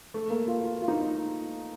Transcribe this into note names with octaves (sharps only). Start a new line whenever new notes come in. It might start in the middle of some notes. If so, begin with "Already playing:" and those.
A3
A#3
F4
F4
F4
D#4